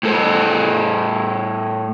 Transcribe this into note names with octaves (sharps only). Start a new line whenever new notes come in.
A2 A4 C5